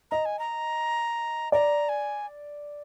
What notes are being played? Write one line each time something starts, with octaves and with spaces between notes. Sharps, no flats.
D#5 A#5
G#5
A#5
D5 A#5
G#5